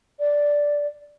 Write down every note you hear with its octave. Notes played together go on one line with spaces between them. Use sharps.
D5